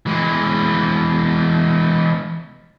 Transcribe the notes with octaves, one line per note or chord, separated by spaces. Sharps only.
E3 G#3